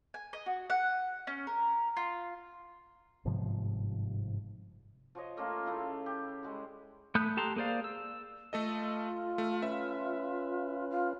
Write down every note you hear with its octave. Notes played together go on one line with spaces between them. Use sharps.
G#5
D#5
F#4
F#5
C#4
A#4
F4
G1 G#2 C3 F3
F3 F#4 C#5 D#5
A3 A#3 C#4 F4
C#3 A3 E4 F5
G4
G3 G#3 F#4
A3 B5 D#6 F#6 G6
G4 A4 A5 A#5 C6
A#3 G#4 C5 D5 F5
E6
A3 F4 A4 D#5
A3
C#4 B4 E5
F4